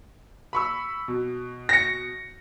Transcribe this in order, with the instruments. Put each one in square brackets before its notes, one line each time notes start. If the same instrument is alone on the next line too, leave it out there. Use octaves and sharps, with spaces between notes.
[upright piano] B5 C#6 E6
B2
[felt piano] A#6 C#7